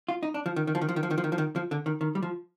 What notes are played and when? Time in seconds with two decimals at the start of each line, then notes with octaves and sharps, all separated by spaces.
0.09 F4
0.23 D#4
0.34 D4
0.46 F3
0.56 D#3
0.67 D#3
0.75 F3
0.81 D#3
0.89 F3
0.96 D#3
1.03 F3
1.11 D#3
1.18 F3
1.24 D#3
1.32 F3
1.38 D#3
1.56 F3
1.71 D3
1.86 D#3
2.01 D#3
2.15 G3
2.23 F3